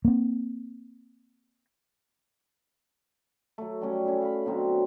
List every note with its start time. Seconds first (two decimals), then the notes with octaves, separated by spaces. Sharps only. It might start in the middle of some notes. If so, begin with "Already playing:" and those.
0.05 A#3 C4
3.58 F#3 A3
3.81 F#3 G3 A3 C#4
4.06 C#4 E4
4.22 F5 B5
4.46 B2 D3 F#3 C4